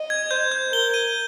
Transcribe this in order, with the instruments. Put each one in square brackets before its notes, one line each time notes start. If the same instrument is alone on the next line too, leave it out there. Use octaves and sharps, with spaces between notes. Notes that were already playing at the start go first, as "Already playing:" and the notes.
Already playing: [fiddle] D#5
[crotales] G#6
[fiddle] C5 [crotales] G6
[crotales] G6
[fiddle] A#4 [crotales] G7
[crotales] D#7